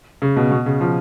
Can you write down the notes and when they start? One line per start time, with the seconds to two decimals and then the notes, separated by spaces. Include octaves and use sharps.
0.22 C#3
0.36 B2
0.51 B2
0.66 C#3
0.81 F3